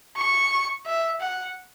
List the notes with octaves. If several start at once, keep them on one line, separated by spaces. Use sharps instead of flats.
C#6
E5
F#5